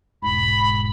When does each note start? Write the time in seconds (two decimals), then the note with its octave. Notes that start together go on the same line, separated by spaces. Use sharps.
0.22 E1 G#2 B5